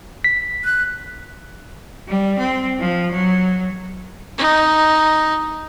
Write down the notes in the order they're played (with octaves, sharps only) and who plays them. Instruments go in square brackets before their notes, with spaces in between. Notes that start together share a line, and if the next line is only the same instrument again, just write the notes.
[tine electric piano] B6
[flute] F#6
[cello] G3
C4
F3
F#3
[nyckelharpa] D#4